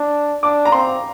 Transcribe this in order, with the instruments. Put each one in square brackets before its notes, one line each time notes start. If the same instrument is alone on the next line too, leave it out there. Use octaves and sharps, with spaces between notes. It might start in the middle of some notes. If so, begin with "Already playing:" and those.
Already playing: [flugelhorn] D4
[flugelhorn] D4 [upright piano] D6
[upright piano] A#5
[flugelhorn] C4 [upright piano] C6